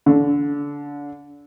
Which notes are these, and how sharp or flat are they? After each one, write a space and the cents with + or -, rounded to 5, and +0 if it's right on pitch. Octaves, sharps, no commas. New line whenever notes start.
D3 -30